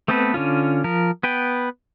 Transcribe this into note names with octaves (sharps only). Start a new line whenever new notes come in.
A3 B3 C4 A4 B4
D3 C#4 F4
F3 A#4
B3 B4 G5